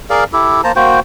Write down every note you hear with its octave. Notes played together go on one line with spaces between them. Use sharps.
G#4 A#4 D5 F5
E4 G4 A4
A#3 C5 A5 A#5
A#3 F#4 C5 G5